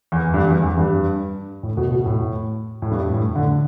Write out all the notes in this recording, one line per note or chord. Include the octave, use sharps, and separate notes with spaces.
E2
G2
E2
E2
G2
A2
B2
B2
A2
A2
G2
A2
D3